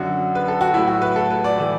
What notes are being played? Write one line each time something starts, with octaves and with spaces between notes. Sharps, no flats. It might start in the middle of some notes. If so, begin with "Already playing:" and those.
Already playing: F#2 D3 F#3 F#4
B4
A4
F#4
A2 F#3 A3 E4
F#4
B4
A4
B4
D5
A2 E3 A3